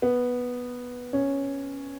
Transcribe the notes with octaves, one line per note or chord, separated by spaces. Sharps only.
B3
C#4